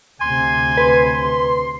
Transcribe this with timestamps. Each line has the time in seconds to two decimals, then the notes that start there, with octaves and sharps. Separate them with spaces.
0.21 D2 C3 G#5 C6
0.77 B4